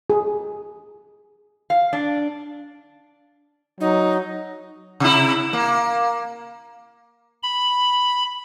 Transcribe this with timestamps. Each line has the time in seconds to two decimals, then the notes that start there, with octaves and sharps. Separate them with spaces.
0.10 G#4
1.70 F5
1.93 D4
3.80 F#3 D#4
5.00 C3 E4
5.53 A#3
7.43 B5